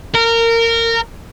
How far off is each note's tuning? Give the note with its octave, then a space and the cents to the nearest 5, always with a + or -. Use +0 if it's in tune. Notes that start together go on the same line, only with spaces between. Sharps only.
A#4 -20